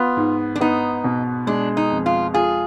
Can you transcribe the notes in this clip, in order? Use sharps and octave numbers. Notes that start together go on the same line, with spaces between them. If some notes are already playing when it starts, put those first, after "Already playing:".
Already playing: B3 F4
G#2
D4
B3 D#4
B2
G#3 D4
D#4
F2
F4
F4 G#4